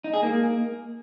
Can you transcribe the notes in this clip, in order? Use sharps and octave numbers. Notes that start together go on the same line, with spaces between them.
D#4
G#4
A#3